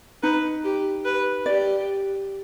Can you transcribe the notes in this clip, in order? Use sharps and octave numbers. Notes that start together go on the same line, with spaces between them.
D#4 B4
G4
B4
G4 D5